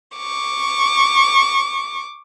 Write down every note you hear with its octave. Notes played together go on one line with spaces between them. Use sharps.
C#6 D6